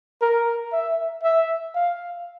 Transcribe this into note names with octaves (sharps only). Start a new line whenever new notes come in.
A#4
E5
E5
F5